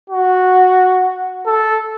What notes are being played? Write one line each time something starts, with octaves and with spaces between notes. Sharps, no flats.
F#4
A4